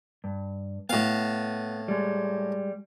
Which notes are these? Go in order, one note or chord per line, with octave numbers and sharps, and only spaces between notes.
G2
A2 B3 F5
G3 G#3